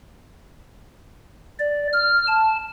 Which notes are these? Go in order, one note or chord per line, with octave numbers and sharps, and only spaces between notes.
D5
F6
A5